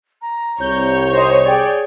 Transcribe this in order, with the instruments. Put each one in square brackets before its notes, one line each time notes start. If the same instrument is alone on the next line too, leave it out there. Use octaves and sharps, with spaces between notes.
[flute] A#5
[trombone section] C2 [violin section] C#5 [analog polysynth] G6
[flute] D#4 [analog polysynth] C5 D#5
[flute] G#4 [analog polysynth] D5 G5